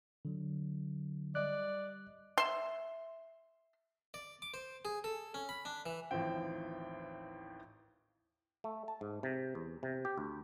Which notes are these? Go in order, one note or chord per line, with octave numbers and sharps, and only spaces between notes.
D3 F#3
G3 D5 D#5 F#6
E5 C6
D5
D6
C5
G#4
A4
C#4
B5
D4
E3
A1 D#2 E3 F3 C4 G5
A3
A5
G#2
C3
E2
C3
G4
D2